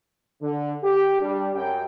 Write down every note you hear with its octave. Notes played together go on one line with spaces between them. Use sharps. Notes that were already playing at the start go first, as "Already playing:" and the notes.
D3
G4
G3 D4
F#2 G5